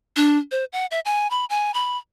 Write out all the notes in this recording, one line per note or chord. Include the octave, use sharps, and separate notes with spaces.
D4
C5
F#5
E5
G#5
B5
G#5
B5